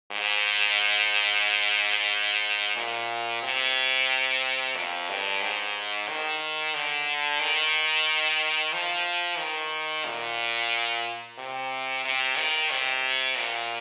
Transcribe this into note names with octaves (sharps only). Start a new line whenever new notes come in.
G#2
A#2
C3
F2
G2
G#2
D#3
D3
D#3
F3
D#3
A#2
C3
C3
D#3
C3
A#2